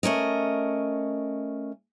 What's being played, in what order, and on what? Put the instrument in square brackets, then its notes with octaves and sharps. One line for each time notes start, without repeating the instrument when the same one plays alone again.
[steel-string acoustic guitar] A3 C#4 A#4 D#5